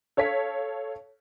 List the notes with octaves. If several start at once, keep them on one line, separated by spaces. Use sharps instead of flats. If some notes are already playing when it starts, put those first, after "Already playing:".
A4 C#5 F5 B6